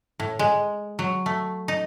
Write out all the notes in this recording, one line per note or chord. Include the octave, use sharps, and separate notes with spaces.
A2
G#3
F#3
A3
D#4